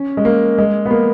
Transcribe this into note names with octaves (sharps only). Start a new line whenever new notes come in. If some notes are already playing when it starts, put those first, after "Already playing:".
Already playing: C#4
G#3
A#3
G#3
B3
A#3